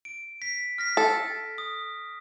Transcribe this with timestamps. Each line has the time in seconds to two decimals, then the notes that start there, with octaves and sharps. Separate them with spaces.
0.05 D7
0.42 B6
0.78 F6 A#6 B6
0.97 A4
1.58 D#6